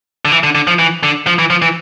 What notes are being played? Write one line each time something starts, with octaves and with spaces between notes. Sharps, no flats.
D3
E3
D3
D3
F3
E3
D3
F3
E3
F3
E3